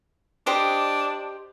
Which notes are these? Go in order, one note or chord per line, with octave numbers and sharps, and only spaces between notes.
D4 G4 C5 D#5